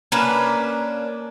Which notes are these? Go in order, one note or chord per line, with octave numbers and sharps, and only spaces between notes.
A#3 C#4 D4 B4